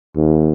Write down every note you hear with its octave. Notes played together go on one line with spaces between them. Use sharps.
D#2